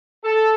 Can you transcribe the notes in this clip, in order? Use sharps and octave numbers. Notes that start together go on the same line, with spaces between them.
A4